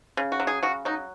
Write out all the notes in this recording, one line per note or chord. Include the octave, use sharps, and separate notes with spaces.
C#3
F#4
F#3
G#4
C#3 F#4
F#3 D#4